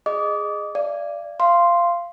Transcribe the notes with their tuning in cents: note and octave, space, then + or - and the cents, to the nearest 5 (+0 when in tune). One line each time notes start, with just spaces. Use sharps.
G#4 +0 D#5 -20 D6 -30
D5 +0 F5 -40
F5 -15 C6 +0